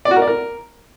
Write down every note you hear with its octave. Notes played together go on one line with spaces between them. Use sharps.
D5
F#4
A#4
D5
A#4